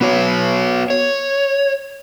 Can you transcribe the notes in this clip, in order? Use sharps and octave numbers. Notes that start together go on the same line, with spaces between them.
B3 F#4 C#5
C#5